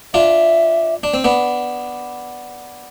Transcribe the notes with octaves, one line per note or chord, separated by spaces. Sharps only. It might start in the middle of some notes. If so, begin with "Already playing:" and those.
D4 F4 E5
D4
C4
B3 D4